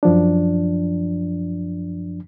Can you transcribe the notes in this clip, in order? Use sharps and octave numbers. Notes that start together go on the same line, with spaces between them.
F#2 F3 D4